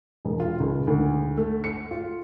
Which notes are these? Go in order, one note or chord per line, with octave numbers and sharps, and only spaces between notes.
E1
F4
C#2
D2
A3
C#7
F4